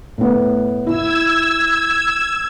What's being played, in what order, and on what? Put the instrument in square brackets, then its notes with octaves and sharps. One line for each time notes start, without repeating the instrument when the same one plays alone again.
[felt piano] A2 B3
[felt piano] E4 [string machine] E6 G#6